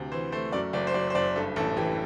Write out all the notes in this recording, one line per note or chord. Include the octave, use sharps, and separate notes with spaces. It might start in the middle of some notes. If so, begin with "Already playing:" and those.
Already playing: D2 C3
E3 C5
A3 C5
F#2 D5
F#1 D5
C5
F#3 D5
C5
F#1 D5
G2 A4
A1 A4
E3 G4